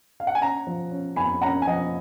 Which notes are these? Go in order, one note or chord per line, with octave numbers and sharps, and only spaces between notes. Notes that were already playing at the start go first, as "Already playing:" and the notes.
F5
F#5
G#5
C#4 F#5 A#5
F3
C#4
F2 G#5 B5
C#4 F#5 A#5
G#5
F3 D#5 F#5